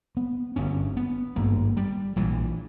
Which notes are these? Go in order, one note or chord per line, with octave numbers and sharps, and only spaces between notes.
B3
G1 G2 C#4
B3
G#1 G2 A#3
G3
A#1 A#2 E3